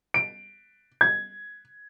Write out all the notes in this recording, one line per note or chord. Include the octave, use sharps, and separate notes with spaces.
D7
G#6